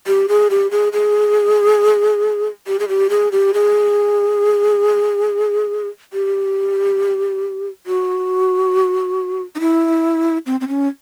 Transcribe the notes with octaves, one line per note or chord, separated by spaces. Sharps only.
G4
G#4
G4
G#4
G#4
G4
G#4
G4
G#4
G4
G#4
G4
F#4
D#4
E4
C4
C4
C#4